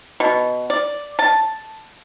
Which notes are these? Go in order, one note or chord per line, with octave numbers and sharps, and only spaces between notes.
B2
D5
A5